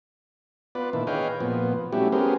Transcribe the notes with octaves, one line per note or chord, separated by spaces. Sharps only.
B3 F4 B4 D5
A#2 D#3 D4 E4
G#4 B4 C#5 D#5 F5 G5
A#2 F3 B3
G3 A3 C#4 E4 F#4 G4
B3 C#4 G4 G#4 A#4 C5